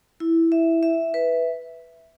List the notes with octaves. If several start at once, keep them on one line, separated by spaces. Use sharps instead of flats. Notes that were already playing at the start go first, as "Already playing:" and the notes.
E4
E5
E5
B4